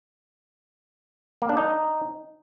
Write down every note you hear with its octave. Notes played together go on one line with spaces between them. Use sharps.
A#3
D4
D#4